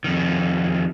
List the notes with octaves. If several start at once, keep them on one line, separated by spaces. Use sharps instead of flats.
F2 D#3